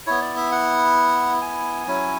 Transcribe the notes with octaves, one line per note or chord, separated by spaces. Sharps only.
B3 E4 C#5
D5
E5
F#5
G#5
F#3 C#4 E4